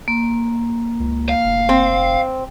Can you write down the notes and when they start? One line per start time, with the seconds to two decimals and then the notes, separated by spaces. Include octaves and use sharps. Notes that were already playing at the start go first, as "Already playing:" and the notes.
0.08 A#3
1.00 C#2
1.29 F5
1.45 F1
1.69 C4